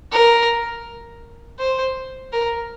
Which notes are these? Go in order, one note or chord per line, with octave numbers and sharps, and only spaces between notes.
A#4
C5
A#4